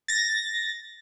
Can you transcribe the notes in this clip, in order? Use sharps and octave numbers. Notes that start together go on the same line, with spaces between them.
A6 A#6